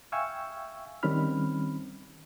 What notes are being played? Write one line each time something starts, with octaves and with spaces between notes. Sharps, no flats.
E5 F5 G5 G#5 C#6 E6
D#3 G3 C4 C#4 B5 F6